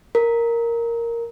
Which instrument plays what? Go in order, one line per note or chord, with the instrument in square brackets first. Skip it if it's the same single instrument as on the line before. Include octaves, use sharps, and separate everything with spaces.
[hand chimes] A#4